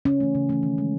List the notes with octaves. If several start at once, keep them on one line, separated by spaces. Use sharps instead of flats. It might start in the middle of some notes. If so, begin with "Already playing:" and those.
C#3 C#4
E3 A3
C#3
E3 A3
D#3
G#3